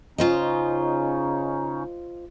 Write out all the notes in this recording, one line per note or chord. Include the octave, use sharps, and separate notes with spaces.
C#3 C#4 D#4 F4 C5 D#5